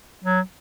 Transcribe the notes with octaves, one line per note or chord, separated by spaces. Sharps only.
F#3